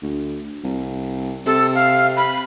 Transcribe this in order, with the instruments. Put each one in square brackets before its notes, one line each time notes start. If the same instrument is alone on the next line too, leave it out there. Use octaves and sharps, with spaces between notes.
[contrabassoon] D2
C2
[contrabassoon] C3 [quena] A4
[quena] F5
B5